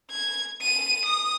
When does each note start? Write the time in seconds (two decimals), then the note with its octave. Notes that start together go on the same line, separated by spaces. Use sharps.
0.11 G#6
0.61 D#7
1.05 D#6